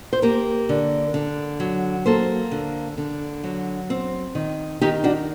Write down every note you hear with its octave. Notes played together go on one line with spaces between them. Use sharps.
C5
A#3 G4 A#4
D3
D3
F#3
A#3 A4 C5
D3
D3
F#3
C4
D#3
D#3 D#4 G4
D4 F#4